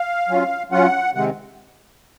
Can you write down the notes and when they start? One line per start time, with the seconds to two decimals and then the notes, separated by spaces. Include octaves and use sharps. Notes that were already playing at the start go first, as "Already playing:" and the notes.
Already playing: F5
0.29 F#3 C#4 F4
0.72 F#3 C#4 F4 F#5
1.15 C3 D#3 G#3 C4 F#5